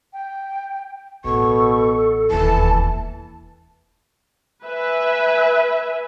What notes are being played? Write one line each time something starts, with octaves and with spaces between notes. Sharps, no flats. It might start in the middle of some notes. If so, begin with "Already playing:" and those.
G5
A1 B2 A4 C#6
E1 D#2 E3 A5
B4 E5 G#5